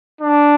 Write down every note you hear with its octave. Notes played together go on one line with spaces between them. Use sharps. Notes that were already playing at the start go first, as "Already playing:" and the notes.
D4